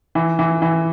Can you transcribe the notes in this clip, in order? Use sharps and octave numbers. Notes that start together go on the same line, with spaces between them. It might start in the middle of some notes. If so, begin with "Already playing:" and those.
E3
E3
E3